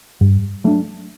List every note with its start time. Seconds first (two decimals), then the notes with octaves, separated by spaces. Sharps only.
0.21 G2
0.64 F#3 A3 D4